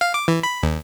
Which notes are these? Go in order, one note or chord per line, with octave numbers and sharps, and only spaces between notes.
F5
D6
E3
B5
D#2